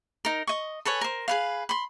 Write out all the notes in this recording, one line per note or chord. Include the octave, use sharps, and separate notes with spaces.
D#4 A#4
D#5 C#6
A4 B4 C#5 G#5
A#4 C5
G#4 B4 F5
B5 C6